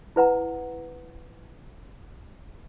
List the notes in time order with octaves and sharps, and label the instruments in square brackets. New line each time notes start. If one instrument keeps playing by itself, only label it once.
[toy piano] E4 B4 F#5 A#5